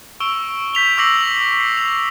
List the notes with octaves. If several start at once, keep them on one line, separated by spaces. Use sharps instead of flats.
C#6 E6 D7 F7 G7
G6 B6 F7 G7
C#6 D6 E6 A#6 C7 F#7
C7
F7